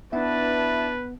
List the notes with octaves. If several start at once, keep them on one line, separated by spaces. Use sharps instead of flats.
B3 D4 E4 B4 A5